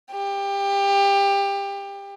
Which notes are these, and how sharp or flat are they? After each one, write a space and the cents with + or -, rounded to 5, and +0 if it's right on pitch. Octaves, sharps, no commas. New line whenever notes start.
G4 +25